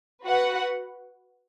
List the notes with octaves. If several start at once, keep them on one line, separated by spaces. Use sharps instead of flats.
F#4 B4 F#5